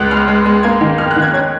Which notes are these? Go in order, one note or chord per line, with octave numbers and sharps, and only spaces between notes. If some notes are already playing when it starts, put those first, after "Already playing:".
Already playing: C#2 F#6
G#3 F6
G#3
G#3
A#3 G#6
D#3
F2 F6
F#6
D#3
G#6
C#4 G#6